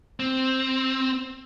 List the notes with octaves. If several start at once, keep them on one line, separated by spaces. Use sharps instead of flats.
C4